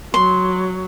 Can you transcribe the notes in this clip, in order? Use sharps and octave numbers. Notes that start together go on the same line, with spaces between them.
F#3 C6